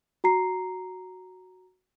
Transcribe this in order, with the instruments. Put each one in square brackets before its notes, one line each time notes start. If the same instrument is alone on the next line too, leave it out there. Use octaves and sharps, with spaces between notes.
[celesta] F#4 A#5 C7